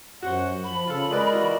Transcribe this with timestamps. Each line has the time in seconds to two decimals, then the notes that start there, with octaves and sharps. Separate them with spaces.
0.23 F#2 F#4 C5 F#5
0.64 F3 B5
0.87 C#3 F4 A4
1.11 G#3 A#4 B4 D5 D#5
1.33 E3 F4 F#4